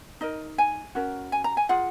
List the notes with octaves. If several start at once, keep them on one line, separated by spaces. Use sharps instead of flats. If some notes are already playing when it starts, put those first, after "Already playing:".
D#4 A#4 D#5
G#5
C#4 F#4 A#4
G#5
A#5
G#5
F4 G#4 F#5